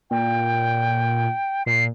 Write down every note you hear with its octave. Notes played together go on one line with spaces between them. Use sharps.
A#2 G5
A#2 C7